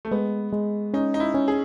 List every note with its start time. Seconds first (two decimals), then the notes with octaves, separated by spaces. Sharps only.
0.05 A3
0.11 G#3 B3
0.52 G#3
0.93 C#4 D#4
1.14 D#4
1.20 E4
1.34 C#4
1.48 G#4